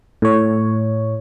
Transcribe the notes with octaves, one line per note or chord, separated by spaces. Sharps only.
A2 C#5